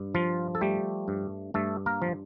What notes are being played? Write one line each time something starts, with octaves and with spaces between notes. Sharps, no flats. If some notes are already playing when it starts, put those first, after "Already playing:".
Already playing: G2
F3 F4
A4
G3 A3 G4
G2
G2 A3 A4
A#3 A#4
F3